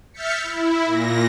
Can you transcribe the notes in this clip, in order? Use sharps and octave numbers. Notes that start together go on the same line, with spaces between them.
E5 F6 G6 A6 B6 C#7
E4
A#2 A#6